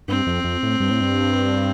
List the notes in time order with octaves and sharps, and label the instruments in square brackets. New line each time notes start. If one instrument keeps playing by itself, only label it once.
[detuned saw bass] G2 [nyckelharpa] C4
[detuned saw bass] F2
F2
A2
G2
A2
G2